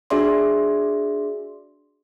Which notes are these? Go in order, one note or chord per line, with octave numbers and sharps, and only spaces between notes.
D4 F#4 G#4 D5 E5 C6